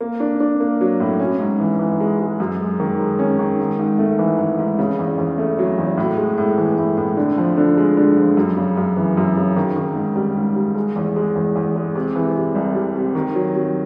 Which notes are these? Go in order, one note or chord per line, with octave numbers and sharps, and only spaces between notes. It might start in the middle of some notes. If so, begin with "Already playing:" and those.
A#3
D4
D4
A#3
F#3
A2
C#4
G#2
E3
E3
G#3
G#3
F#2
G#3
D#3
G#3
C#4
D#3
G#2
G#2
A3
E3
E3
G#2
C#3
E2
E2
A3
F#3
E2
A2
G#3
A2
E3
A2
A2
D3
F3
D3
G#3
D3
F3
F#2
C#3
F#2
E3
F#2
C#3
D#3
D#3
G#2
G3
G#2
G3
G#3
E2
G#3
E2
E2
G#3
C3
E3
C3
C2
G3
C3
D#3
F#3
F#3